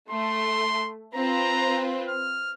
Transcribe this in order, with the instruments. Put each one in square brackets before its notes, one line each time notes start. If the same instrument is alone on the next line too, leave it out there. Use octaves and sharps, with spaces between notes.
[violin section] A3 [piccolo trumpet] C6
[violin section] C4 F4 B4 [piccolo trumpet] A#5
[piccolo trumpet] F6